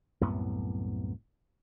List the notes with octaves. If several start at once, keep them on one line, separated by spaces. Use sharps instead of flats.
C2 F#2 A2 B3